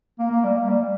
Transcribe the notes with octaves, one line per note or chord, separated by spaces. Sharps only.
A#3
A#3
G3
A#3
G3
G3